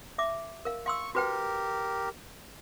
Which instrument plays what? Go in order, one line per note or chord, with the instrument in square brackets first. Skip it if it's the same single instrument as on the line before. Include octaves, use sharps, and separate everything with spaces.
[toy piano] E5 D6
A#4 F5
[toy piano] F5 C6 E6 [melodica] C#6
[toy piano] F#4 B4 G5 [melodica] G4 A#4